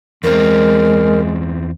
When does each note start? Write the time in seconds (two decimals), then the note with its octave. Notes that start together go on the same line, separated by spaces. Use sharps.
0.24 E2 G#3 C4 A#4